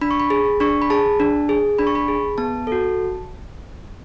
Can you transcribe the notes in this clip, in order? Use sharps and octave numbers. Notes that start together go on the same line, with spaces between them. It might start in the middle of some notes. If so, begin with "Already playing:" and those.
D4 B5
C#6
B5
G#4
D4 C#6
B5
G#4 A5
D4
G#4
D4 B5
C#6
B5
G#4
B3 A5
F#4 A4